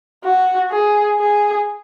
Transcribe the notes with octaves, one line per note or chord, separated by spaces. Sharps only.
F#4
G#4
G#4